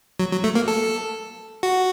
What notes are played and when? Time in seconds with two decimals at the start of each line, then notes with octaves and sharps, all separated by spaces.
0.20 F#3
0.32 F#3
0.44 A3
0.55 A#3
0.68 A4
1.63 F#4